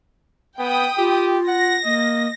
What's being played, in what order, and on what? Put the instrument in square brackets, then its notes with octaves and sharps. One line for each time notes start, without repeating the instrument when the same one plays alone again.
[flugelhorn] B3 [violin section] G5 B5 D#6
[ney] F4 [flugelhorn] G4
[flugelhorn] F#5 [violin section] A#6
[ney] A#3 [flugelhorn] D#5